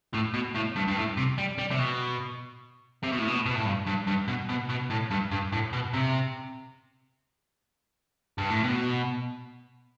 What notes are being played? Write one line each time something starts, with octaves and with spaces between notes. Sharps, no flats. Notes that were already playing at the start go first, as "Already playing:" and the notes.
A2
B2
A2
G2
G2
A2
C3
G3
G3
C3
B2
C3
B2
A2
B2
B2
A2
G2
G2
G2
B2
B2
B2
A2
G2
G2
A2
B2
C3
G2
A2
B2